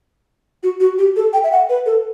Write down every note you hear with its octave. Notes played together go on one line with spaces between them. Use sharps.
F#4
F#4
G4
A4
G5
E5
F#5
B4
A4